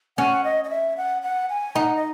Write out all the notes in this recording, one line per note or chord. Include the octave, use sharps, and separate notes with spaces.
C#4 F#5
D#5
D#5
E5
F#5
F#5
G#5
D#4 F#5
D#5